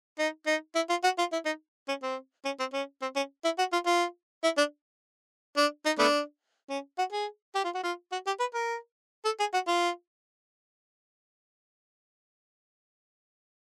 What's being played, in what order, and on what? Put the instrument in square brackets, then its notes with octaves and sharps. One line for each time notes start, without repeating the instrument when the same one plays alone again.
[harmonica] D#4
D#4
E4
F4
F#4
F4
E4
D#4
C#4
C4
C#4
C4
C#4
C4
C#4
E4
F#4
F4
F4
E4
D4
D4
D#4
A3 B3 D4
C#4
F#4
G#4
G4
F4
F#4
F4
F#4
G4
B4
A#4
A4
G#4
F#4
F4